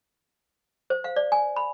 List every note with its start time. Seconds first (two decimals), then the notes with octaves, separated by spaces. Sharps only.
0.90 C5
1.04 F5
1.16 D5
1.32 G#5
1.56 B5